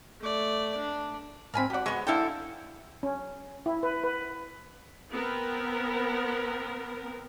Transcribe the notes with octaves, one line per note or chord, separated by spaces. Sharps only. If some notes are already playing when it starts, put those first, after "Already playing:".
A3 D5
D4
G#2 C4 A#4 G#5 B5
F#4 G4 D5 F#5
G#3 B3 C#6
D3 D4 E4 A4 F5 G5
C#4
E4
B4
B4
B3 C4 A#4